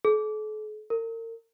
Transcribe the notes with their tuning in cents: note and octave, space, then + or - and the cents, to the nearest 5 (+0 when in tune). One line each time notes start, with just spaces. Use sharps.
A4 -45
A#4 -40